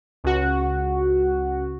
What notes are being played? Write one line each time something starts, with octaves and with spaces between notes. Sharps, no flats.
C#2 F#4